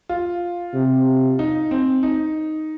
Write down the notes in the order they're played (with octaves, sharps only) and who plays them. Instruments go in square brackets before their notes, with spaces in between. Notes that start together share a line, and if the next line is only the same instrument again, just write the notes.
[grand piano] F4
[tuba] C3
[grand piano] D#4
C4
D#4